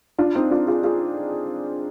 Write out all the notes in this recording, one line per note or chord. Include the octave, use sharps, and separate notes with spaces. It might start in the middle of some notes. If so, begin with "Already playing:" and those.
D4 F4
C4 D#4
D4 F4
F4 G#4
F4 G#4